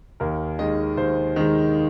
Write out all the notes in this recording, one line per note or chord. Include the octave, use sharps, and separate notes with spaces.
D#2 A#4
D#3 G#3 D#5
D#2 C5
D#3 G#3